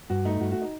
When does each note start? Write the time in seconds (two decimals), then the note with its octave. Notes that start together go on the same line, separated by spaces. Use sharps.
0.10 G2 F#4
0.25 A3 D#4
0.40 G2 F#4
0.51 F#4
0.61 D#4